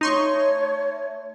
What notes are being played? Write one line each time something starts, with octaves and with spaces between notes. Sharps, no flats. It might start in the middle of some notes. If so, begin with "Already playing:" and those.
A3 D#4 C#5 C6 C#6